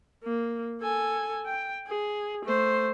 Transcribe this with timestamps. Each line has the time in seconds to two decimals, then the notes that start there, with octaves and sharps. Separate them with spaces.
0.24 A#3
0.82 A4 G#5
1.46 G5
1.87 G#4
2.45 A3 C5